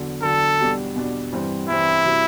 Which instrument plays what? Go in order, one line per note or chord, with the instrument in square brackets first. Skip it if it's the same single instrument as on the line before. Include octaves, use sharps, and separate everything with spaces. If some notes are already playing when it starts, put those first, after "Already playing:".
Already playing: [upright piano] E2 D3 F#3
[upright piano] E2 D3 F#3 [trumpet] A4
[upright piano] E2 B2 G3 D4
E2 B2 G3 D4
G2 E3 G3 C4
[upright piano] G2 E3 G3 C4 [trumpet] E4
[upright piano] C3 G3 C4 F#4